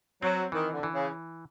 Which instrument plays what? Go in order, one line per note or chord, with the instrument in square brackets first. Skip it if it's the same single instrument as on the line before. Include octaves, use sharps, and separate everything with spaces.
[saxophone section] F#3 [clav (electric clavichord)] C4
[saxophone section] D#3 [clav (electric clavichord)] E3
[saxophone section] D3
[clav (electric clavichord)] E3
[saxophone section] C#3